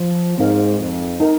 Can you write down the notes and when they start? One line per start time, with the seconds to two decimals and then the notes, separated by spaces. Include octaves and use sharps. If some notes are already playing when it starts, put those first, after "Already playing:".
Already playing: F3
0.38 G#2 C4 D#4 A#4 F5
0.80 F2
1.20 D#4 A#4